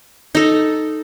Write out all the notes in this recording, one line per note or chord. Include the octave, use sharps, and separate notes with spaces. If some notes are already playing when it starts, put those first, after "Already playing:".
D#4 A4